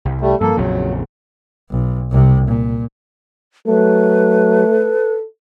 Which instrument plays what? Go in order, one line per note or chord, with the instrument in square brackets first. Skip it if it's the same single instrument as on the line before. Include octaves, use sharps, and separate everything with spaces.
[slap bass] C2
[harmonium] G3 A3
[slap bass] G2 F3 [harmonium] A#3 A4
[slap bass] A#1 F2 C#3 [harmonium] F#3
[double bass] B1
C2 C3
A#2
[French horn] F#3 [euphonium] A3 [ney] B4
[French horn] A4